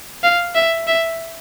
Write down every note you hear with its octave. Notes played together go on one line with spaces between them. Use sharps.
F5
E5
E5